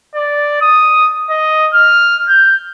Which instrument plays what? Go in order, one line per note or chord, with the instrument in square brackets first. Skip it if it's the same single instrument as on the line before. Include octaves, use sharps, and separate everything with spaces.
[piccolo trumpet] D5
D#6
D#5
F6
G6